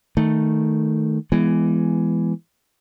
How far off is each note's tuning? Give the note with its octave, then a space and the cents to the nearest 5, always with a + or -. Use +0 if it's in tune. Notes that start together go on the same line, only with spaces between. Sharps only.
D#3 +0 A3 +0
E3 +15 G#3 +0 B3 +0